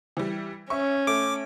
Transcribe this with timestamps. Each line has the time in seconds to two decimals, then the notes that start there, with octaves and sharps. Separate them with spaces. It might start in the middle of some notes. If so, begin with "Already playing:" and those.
0.17 E3 G3
0.70 C#4 E5 C#6
1.07 A3 D6